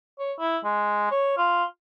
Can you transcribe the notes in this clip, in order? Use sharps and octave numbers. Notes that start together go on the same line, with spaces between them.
C#5
E4
G#3
C#5
F4